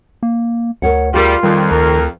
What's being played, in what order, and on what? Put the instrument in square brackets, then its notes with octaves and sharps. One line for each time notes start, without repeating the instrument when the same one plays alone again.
[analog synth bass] A#3
[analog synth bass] D2 [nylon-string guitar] A#4 C#5 F#5
[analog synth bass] D2 [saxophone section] G3 [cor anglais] F4 [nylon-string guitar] G#4 A#4
[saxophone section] F2 [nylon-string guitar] D#3 [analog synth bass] G3
[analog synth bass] D2 [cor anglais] A#4